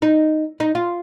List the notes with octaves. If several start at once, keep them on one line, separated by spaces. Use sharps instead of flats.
D#4
D#4
F4